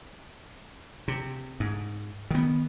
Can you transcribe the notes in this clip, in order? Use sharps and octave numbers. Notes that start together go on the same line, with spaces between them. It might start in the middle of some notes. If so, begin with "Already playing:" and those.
C3
G#2
D#3 B3